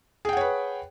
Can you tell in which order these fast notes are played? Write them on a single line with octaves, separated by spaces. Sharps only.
G#4 G5 F#5 C#5 B4